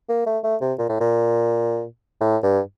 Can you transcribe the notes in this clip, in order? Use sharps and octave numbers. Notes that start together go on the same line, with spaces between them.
A#3
A3
A3
C3
A#2
A2
A#2
A2
G2